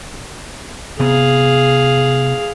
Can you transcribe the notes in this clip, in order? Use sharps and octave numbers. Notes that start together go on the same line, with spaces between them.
C3 B3 G#4 F5